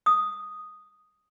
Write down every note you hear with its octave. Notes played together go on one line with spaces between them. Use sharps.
D#6